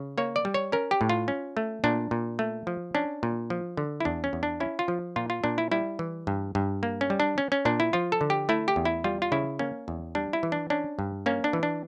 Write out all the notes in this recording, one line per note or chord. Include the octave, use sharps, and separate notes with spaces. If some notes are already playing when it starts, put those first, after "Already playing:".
Already playing: C#3
A#3 C#5
D5
G3
C#5
C#4 A#4
G4
A2
F4
C#4
A3
A#2 D4
A#2
A3
F3
C#4 D4
A#2
F3
D3
E4
E2 D4
C#4
E2
D4
C#4 E4
F4
F3
A#2 F4
F4
A#2 D4
E4
G3 E4
E3
G2
G2
A#3
C#4
G3
D4
C#4
C#4
A#2 D4
E4
F3 F4
A4
D3
G4
A3 E4
G4
E2
E4
G3 F4
F4
C#3 E4
A#3 C#4
E2
G3 D4
E4
E3
D4
C#4 D4
G2
A#3 C#4
D4
E3
D4